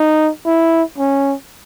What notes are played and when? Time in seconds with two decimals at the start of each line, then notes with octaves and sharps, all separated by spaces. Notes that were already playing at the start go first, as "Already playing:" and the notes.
Already playing: D#4
0.46 E4
0.98 C#4